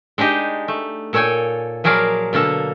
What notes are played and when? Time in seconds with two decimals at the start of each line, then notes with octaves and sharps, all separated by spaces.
0.18 G#3 D4 D#4 G4 D#5
0.68 A3
1.13 A#2 A4 C#5 G5 G#5
1.84 F3 F#3 G#4 A#4 D5 F5
2.33 B2 D3 A#3 A4